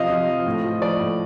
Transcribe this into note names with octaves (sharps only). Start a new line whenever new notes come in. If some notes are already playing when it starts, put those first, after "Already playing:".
Already playing: C3 F3 D#5 F5
F3
F3
A2
F3
F3 D5
A2